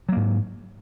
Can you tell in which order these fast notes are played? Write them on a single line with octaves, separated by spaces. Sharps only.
F#3 A#3 G#2